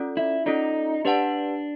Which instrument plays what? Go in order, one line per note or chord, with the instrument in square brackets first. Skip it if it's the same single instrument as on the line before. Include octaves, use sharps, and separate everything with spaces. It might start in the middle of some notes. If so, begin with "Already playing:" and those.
Already playing: [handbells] C#4 F4 A4 D5
[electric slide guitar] E4
[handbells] C#4 F4 A4 D5 [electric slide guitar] D#4
[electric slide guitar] D4 [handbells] G4 B4 D5 F#5 A5